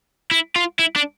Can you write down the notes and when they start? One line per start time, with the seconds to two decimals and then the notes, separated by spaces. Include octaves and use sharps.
0.31 E4
0.56 F4
0.79 E4
0.96 D4